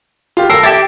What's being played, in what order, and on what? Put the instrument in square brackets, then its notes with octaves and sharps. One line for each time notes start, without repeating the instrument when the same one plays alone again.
[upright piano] F4 G4
[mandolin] A#4 [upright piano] A5 E6 C7
[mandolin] E4 G4 [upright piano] A6 E7